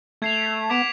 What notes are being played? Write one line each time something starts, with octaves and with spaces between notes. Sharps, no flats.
A3 G#6 C7 F7
B3 D6 G#6 B6 D7 F7